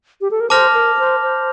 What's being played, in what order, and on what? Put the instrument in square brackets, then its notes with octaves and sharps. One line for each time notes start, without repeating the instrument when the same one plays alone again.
[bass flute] G4
A4
A#4
[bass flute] C5 [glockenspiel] A5 D6 F6 A#6 F7
[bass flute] A#4
C5
C5